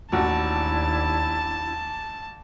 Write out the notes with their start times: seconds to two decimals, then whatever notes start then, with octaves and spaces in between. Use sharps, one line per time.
0.12 A1 D#2 D4 E4 F#4 A5